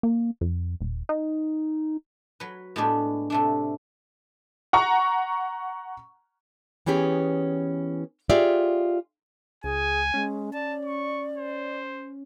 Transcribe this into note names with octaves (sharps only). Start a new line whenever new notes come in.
A#3
F2
D#1
D#4
F#3 B4
A2 G#3 B3 D4 G4
C3 A3 D4
F#5 A#5 C#6
E3 B3 C#4 G4 G#4
F4 G4 G#4 D5 E5
C#2 G#4 G#5
G#3 C#4
D5 A5
C#6
C5